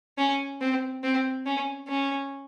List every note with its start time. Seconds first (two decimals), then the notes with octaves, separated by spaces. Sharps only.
0.18 C#4
0.61 C4
1.03 C4
1.46 C#4
1.88 C#4